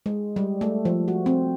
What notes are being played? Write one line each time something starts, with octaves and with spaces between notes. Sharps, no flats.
G#3
G3
A3
F3
F#4
C4